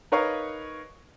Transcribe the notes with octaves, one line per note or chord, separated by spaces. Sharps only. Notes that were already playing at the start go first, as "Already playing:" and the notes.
D#4 A#4 B4 C#5 F5 C#6